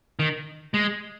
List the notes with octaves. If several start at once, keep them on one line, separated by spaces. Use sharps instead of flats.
D#3
G#3